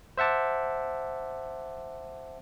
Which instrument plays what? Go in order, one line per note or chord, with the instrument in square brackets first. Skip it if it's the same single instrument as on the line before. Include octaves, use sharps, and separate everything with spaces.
[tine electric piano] C5 E5 F#5 A5 D6